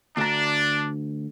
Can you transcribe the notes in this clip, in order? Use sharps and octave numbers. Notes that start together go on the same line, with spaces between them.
D2 D4 A#5